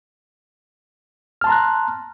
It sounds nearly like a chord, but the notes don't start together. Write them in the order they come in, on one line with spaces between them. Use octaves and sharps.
F6 A5 C6 A#5 F#6